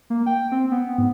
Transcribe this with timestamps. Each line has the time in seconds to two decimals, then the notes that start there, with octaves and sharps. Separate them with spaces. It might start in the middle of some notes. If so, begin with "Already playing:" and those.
0.10 A#3
0.26 G5
0.52 C4
0.72 B3
0.98 G#2